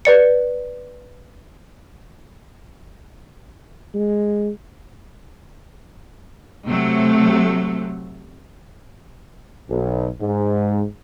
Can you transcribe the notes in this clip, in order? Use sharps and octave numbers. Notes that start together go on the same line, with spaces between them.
B4 D5 C#7
G#3
C3 F#3 A3
B1
G#2